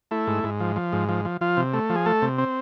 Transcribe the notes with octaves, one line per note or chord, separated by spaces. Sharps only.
A3 E4
G#2
G#2
F3
F3
G#2
F3
F3
F3 F4
C3
A3
F3
G#4
A3 A4
C3
C4